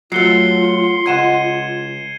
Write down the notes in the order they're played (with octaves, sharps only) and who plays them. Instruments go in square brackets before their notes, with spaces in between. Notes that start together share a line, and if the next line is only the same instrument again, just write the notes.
[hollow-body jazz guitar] F#3 A3 [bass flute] F4 [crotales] C7 C#7 G7
[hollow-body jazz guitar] C#2 F#5 C6 [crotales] G#6 D#7 E7